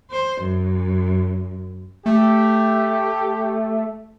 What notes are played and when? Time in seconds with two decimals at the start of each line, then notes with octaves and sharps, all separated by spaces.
0.11 C5
0.42 F#2
2.06 A3 G4